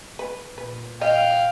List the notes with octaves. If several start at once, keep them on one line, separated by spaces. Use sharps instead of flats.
B4
A#2 B4
D#5 F5 G5